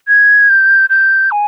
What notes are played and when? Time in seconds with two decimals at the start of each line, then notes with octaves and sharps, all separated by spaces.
0.08 G#6
0.49 G6
0.90 G6
1.31 G#5